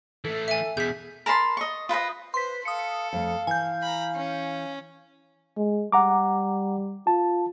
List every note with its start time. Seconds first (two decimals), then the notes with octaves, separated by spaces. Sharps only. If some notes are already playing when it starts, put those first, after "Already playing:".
0.25 E3 A3 A4
0.48 E5 G#5
0.77 E2 B2 G#4 G6 B6
1.26 A#4 A5 B5 C6
1.57 D#5 C#6
1.89 F4 B4 C5 D#5
2.34 B4 C5 C6 B6
2.65 A4 F5 D#6 C#7
3.13 F2 A3 F5
3.47 E3 G#5 G6
3.82 A#5 B5
4.14 C#4
5.57 G#3
5.92 G3 F#5 A#5 D6
7.07 F4 A5